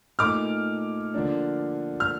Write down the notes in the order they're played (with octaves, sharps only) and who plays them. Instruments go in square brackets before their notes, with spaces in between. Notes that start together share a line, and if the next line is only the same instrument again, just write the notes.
[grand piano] A#2 A3 D#4 [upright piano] D6 F6
[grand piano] D3 F3 A#3 D4
[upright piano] F6